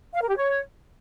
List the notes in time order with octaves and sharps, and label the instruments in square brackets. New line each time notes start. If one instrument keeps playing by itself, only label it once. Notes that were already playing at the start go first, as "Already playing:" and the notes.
[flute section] F5
A#4
G4
C#5